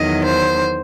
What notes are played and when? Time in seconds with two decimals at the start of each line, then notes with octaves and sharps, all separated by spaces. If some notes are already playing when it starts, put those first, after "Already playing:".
Already playing: E2 D#3 F#3 D#5
0.25 C5